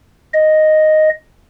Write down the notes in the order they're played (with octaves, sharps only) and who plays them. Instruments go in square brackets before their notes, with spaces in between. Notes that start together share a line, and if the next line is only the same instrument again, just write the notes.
[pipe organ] D#5